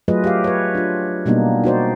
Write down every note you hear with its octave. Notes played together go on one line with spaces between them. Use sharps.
F#3 A3 F4 G#4 B4 D#5
G4 F5
B4 C#5
D4 F4
B2 G3 A#3 B3 D4 D#4
D#4 F#4 C5 D5